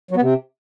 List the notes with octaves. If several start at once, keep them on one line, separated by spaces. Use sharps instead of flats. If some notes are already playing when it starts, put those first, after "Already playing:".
F#3
B3
C3